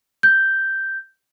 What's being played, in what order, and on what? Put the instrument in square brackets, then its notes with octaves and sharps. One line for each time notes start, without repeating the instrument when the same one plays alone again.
[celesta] G6